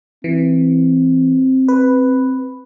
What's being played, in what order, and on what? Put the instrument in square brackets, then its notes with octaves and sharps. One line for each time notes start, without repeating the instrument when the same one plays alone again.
[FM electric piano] E3 [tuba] C4
[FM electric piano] B4